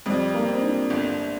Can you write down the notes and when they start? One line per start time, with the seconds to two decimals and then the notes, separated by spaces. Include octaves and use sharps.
0.06 F2 G3
0.34 A#3
0.49 C4
0.62 D4
0.90 G1